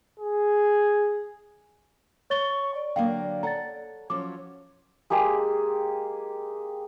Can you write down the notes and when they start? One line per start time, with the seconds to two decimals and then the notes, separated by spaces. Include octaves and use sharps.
0.20 G#4
2.30 C#5 C#6 A6 G7
2.74 D5
2.96 D3 F#3 A#3 F5 G5
3.43 A4 C#5 F#5 A#5 A6
4.10 F3 F#3 C#4 C#5 D6
5.10 G#3 A#3 G4 G#4